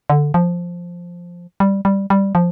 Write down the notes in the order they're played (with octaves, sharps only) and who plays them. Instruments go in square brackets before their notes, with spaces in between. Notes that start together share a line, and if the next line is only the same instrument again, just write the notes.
[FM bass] D3
F3
G3
G3
G3
F3